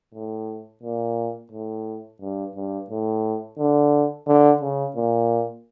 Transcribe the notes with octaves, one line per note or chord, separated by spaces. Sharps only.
A2
A#2
A2
G2
G2
A2
D3
D3
C#3
A#2